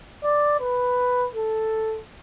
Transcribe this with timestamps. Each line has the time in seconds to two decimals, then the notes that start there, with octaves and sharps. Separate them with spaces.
0.23 D5
0.60 B4
1.33 A4